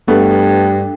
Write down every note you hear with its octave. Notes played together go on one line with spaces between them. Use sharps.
G2 A3 B3